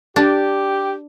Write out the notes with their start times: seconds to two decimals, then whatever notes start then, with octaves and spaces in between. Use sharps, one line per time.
0.16 D4 G4